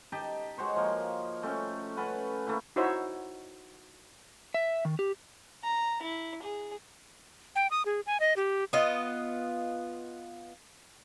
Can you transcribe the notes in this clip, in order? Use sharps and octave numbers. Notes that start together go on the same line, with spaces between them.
D#4 G4 D#5 A5
G#3 F#4 C5 C#5
F3 A#3
A3 C#4 G5
C#4 A4 B4 F#5
A3 A#3 E4
D#4 E4 F#4 C5 C#5 E5
E5
D#3
G4
A#5
E4
G#4
G5
D#6
G#4
G#5
D#5
G4
B3 F4 D#5